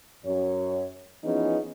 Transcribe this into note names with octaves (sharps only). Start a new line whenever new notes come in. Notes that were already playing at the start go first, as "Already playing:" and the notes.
F#2 C#5
E3 F3 B3 C#4 D#4 G#4